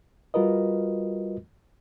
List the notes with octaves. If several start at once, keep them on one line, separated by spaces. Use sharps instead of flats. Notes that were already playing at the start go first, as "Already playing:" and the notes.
G3 F4 F#4 A#4 B4 D#5